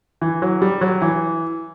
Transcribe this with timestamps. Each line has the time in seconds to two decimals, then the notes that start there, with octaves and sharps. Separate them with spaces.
0.22 E3
0.42 F#3
0.62 G3
0.81 F#3
1.02 E3